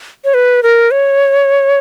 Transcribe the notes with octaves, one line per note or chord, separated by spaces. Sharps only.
C#5
B4
A#4
C#5